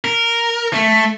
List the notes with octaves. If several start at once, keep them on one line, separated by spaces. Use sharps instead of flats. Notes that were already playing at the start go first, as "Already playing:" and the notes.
A#4
A3